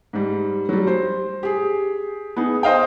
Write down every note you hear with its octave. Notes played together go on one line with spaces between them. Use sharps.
G#2 G3
F#3 G3
C5
G4 G#4
B3 D#4 G#4
C5 D#5 F5 G5